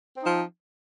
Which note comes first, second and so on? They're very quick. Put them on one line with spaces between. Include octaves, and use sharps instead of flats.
C4 D#4 F3